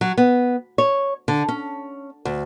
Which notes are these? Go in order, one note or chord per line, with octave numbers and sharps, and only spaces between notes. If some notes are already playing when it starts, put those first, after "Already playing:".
F#3
B3
C#5
D3
C#4
D2